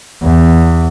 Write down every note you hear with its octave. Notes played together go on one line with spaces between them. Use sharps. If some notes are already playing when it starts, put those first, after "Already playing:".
E2